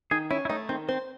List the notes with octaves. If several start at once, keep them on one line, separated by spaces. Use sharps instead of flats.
D#3 G#4
C#4 E4
E4
A3 D#4
D#3 C4
C4 C5